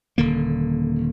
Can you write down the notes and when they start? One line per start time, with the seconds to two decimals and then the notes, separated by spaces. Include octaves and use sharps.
0.18 D#1 D3 A#3